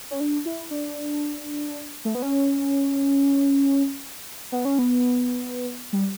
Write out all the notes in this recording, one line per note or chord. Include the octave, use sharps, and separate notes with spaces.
C#4
D4
E4
D4
A3
B3
C#4
B3
C#4
B3
G3